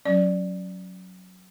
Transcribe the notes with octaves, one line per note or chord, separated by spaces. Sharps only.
F#3 C#4 D5